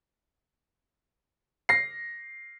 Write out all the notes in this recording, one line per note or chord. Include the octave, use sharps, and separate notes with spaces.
A#6 C7